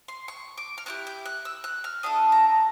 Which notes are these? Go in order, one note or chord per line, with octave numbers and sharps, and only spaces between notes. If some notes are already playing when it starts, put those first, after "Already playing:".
C6
C#6
D6
F6
C#4 E4 G4 F#6
G6
F#6
E6
F#6
F6
A3 D4 F#4 A4 D#6
A#5